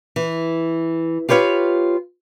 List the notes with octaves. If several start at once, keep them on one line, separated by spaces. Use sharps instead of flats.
E3
F4 G4 B4 C#5 F5